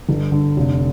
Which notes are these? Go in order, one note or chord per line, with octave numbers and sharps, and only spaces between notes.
G1
D3
F1